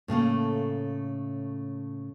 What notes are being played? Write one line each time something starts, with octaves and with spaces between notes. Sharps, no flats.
A2 C#3 A3 A#3